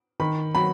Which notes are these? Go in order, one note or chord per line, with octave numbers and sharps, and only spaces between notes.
D#3 B5
F#3 B5